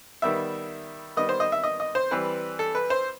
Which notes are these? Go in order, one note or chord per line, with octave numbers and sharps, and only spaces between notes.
D#3 G3 B3 E5
D#3 G3 B3 D#5
C5
D#5
E5
D#5
D#5
C5
E3 G3 C4 B4
A4
B4
C5